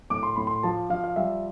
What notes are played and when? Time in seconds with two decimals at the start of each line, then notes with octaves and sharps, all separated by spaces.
0.10 A2 D6
0.23 C6
0.36 A2 B5
0.47 C6
0.63 F3 A5
0.90 F3 F5
1.04 F5
1.16 G3 E5